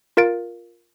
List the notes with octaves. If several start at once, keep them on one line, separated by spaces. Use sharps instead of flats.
F4 A#4 F5 A6 D7